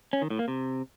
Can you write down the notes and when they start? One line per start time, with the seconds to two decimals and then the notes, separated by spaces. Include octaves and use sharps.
0.13 C#4
0.22 D#3
0.30 A2
0.39 A#3
0.48 C3